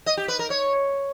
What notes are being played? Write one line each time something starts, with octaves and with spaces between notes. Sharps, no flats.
D#5
G4
B4
A#4
C#5